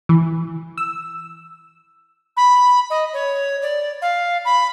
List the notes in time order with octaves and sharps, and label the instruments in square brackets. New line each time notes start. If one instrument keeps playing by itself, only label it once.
[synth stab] E3
E6
[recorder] B5
D#5
C#5
D5
F5
B5